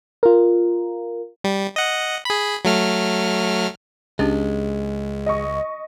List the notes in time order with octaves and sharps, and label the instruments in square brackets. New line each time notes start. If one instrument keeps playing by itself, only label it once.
[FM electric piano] F4 A#4
[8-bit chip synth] G3
D#5 F#5
G#4 B5
F#3 A3 F6
[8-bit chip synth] C#2 [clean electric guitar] G#3 [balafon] C#4 D4 G4
[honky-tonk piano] D#5 C#6